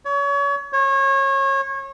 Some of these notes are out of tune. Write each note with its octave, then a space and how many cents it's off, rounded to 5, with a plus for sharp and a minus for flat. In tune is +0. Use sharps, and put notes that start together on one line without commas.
C#5 +30
C#5 -30